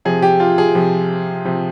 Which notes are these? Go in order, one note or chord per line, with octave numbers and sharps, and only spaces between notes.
C3 F3 G#4
G4
F4
G#4
C3 F3
C3 F3